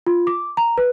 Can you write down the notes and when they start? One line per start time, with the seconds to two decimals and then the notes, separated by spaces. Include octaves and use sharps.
0.07 F4
0.27 D6
0.57 A#5
0.78 B4